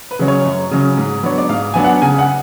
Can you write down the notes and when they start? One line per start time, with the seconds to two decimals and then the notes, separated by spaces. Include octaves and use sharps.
0.11 B4
0.19 C#3 F#3 C#4
0.28 C#5
0.45 F#2
0.71 C#3 F#3 C#4
0.97 G#2
1.23 F#3 B3 D4 C#5
1.38 D5
1.49 G#2 F5
1.74 F#3 B3 D4 G#5
1.84 F#5
2.02 C#3 G#5
2.18 F#5